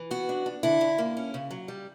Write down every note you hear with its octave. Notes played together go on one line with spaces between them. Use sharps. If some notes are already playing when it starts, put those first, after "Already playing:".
Already playing: E3
B3 F#4
D4
D4
D3 E4
D3
A#3
C#4
C#3
F#3
G3